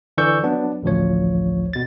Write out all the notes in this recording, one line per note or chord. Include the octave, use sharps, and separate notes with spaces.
D3 E3 D5 C#6 E6 G6
F#3 B3 D4
A1 D2 F3 C#5
B2 A6